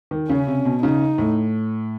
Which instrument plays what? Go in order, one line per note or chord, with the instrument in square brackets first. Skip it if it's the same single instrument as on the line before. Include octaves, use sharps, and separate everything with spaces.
[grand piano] D#3
[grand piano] C#3 [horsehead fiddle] C#4
[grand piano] C3
B2
[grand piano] C#3 [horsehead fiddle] D#4
[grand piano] A2